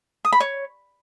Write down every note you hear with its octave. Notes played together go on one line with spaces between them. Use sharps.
D#6
B5
C#5